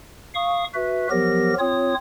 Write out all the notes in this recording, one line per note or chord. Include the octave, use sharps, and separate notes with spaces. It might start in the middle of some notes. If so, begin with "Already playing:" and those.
F5 C#6 D#6
F#4 B4 E5
F3 F#3 B3 G4 A#4 A#6
C4 F4 C#5 D#6